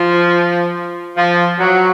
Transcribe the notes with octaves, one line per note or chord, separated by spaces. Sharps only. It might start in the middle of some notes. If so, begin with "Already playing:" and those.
Already playing: F3
F3
F#3